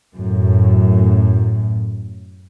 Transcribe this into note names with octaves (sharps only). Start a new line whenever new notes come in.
F#2 A2